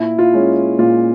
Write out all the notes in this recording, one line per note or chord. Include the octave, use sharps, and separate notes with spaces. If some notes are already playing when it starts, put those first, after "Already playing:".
Already playing: A#2 E4
F4
G#3 C#4
A#2 F4